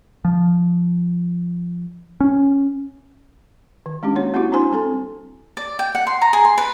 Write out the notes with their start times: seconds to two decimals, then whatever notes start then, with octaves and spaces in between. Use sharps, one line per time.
0.25 F3
2.20 C#4
3.86 D#3
4.03 G#3 C#4 D4 G4
4.15 A#3 D#4 F#4 C#5
4.34 A#3 C4 D#4 E4 F#4 G4
4.52 D4 E4 C5 G#5 C6
4.72 G3 C4 A4 G#5
5.57 D5
5.79 G5
5.95 F#5
6.07 C6
6.21 A#5
6.33 G#4
6.45 C6
6.58 B4